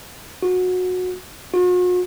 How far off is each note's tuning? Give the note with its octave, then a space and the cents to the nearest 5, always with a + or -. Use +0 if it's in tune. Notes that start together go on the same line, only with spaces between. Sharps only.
F#4 -20
F#4 -45